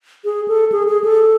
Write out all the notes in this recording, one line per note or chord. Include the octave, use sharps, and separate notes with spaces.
G#4
A4
G#4
G#4
A4